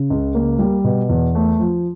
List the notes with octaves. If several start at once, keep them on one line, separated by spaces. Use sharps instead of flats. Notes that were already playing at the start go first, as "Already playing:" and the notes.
Already playing: C#3
C#2
A#3
G3
B2
E2
A3
F3